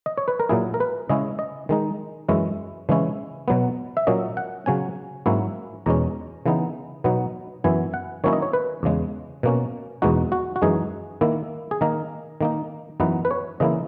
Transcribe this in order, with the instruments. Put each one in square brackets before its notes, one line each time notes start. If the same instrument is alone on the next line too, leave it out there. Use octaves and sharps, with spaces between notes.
[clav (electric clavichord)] D#5
C#5
B4
A#4
A#2 F#3 A#3 E4 G#4
A#4
B4
C#3 G#3 C#4 E4 D#5
D#5
D#3 G#3 D#4
F#2 E3 G#3 C#4 E4
C#3 E3 G#3 C#4 E4
B2 F#3 B3
E5
A#2 F#3 A#3 C#4 D#5
F#5
C#3 F#3 C#4 G#5
G#2 F#3 A#3 C#4 E4
E2 B2 G#3 C#4 A#5
C#3 E3 B3 D#4
B2 F#3 B3 D#4
F#2 E3 B3 E4 G#5
F#5
D#3 F#3 A#3 C#4 E4 C#5
D#5
C#5
B4
E2 C#3 G#3
B2 A#3 C#4
E2 B2 G#3 D#4 F#4
F#4
F#4
F#2 E3 G#3 D#4 G#4
D#3 A#3 E4
G#4
D#3 A#3 D#4 A#4
D#3 A#3 D#4
F#2 E3 B3 D#4 B4
B4
C#5
C#3 E3 A#3 E4 D#5